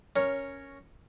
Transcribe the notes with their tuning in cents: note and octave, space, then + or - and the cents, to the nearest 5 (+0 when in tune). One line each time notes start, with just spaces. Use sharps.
C#4 +0 A#4 +0 C#5 +0